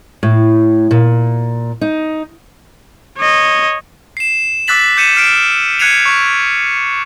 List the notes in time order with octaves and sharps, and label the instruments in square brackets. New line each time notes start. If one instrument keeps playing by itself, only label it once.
[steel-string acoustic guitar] A2
A#2
D#4
[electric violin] C#5 D#5
[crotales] C7 E7
D6 E6 F#6 A6 B6 F#7
D6 G6 C#7 D#7 E7
F6 C7 D7 E7
F#6 G#6 C7 C#7 D#7 F7
C#6